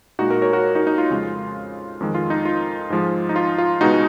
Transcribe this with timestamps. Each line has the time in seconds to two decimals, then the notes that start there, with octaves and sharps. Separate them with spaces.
0.19 A#2 G#3 D#4 F#4
0.30 F#4 A#4
0.42 A#4 C#5
0.53 F#4 A#4
0.75 D#4 F#4
0.87 D#4
0.98 F4
1.10 F2 C#3 G#3
2.00 F2 D#3 G#3
2.15 F4
2.30 D#4
2.45 F4
2.90 G#2 F3 G#3
3.29 D#4
3.36 F4
3.58 F4
3.81 C#2 B2 G#3 D#4 F#4